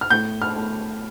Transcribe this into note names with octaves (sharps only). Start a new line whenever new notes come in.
F6
A2 G6
F6
A2